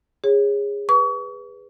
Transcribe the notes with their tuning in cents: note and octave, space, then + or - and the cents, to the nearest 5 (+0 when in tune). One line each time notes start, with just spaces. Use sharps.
G#4 -25 C#5 -15
B4 +0 C#6 +35